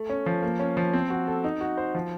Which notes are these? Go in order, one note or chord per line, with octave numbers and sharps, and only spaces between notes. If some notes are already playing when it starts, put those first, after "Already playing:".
Already playing: A3
C#4
F3
A#3
C#4
F3
C4
F#4
A4
D#4
F#4
C5
F3